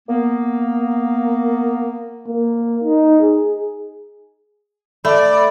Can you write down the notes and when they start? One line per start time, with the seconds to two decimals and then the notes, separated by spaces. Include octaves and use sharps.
0.09 A#3 B3
2.28 A#3
2.84 D#4
3.21 G#4
5.05 A3 D5 B5